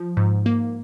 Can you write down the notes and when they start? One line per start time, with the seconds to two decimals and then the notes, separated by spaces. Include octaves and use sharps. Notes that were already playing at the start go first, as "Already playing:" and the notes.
Already playing: F3
0.17 G#2
0.46 A#3